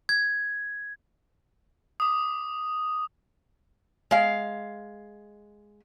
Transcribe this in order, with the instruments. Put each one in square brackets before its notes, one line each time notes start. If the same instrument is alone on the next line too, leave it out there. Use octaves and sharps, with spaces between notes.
[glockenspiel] G#6
[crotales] D6 D#6
[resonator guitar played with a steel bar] G#3 F5